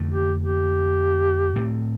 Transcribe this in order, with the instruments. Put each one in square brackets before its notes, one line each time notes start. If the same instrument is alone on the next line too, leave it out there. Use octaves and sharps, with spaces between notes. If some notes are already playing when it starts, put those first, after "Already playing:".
Already playing: [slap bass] F2 D3 A3
[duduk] G4
G4
[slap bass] A2 A3 C4